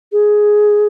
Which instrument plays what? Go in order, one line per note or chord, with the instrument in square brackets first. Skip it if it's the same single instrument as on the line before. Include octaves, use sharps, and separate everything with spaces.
[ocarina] G#4